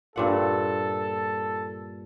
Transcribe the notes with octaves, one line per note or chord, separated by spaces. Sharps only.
G2 A#2 A4 F#5